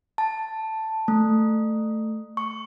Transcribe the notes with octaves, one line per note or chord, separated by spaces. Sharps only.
A5
A3
C#6